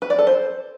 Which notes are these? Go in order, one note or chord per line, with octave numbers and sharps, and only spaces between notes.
B4
D5
A4
C5